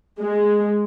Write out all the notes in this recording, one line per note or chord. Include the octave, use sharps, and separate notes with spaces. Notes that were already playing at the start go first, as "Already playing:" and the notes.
G#3